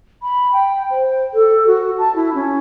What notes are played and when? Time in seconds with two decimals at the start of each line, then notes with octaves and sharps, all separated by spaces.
0.22 B5
0.52 G5
0.91 C5
1.34 A4
1.67 F#4
1.98 A5
2.15 E4
2.34 C#4